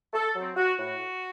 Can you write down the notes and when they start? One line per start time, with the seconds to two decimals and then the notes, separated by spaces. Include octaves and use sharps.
0.13 A4
0.35 F#3 C4
0.56 F#4
0.78 A2 F#4